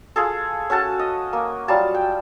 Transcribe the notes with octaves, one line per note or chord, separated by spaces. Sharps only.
F4 G#4 A4
C#4 F#4 A4 A5
D#5
A#3
F#3 G3 F4 A5
G5